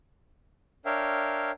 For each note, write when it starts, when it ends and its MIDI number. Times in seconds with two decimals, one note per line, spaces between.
0.86 1.51 62
0.86 1.51 70
0.86 1.51 73
0.86 1.51 76
0.86 1.51 77
0.86 1.51 79